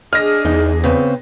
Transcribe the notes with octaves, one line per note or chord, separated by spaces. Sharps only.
D4 G#4 D#5 F6 A#6
E2 D#4
C#3 B3 C4